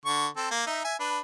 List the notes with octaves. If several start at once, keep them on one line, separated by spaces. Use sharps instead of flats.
D3 C#6
C4 A4
A#3
D#4 E5
E5 G#5
D4 B4